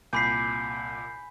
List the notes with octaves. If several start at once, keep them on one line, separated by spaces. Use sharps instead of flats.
C2 A#2 G#5 B5 D6 G6 B6 C7